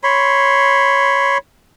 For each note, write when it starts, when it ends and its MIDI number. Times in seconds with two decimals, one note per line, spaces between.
0.04 1.38 73
0.04 1.38 83
0.04 1.38 84